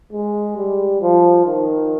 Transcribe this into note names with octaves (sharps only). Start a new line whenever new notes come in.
G#3
G3
F3
D#3